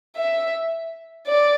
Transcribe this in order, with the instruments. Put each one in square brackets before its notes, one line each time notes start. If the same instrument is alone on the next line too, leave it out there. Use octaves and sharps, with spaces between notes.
[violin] E5
D5